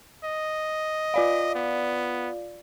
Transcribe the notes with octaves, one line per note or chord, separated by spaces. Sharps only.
D#5
F4 D5 F5
B3